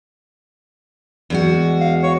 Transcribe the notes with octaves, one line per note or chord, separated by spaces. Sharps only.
E2 G#3 F#4
F5
C#5